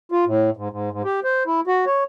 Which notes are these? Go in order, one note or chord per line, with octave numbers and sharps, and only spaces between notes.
F4
A2
G#2
G#2
G#2
G4
C5
E4
F#4
C#5